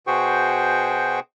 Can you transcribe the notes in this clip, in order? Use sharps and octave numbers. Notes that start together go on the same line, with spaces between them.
B2 F#4 G#4 C5 G5 C#6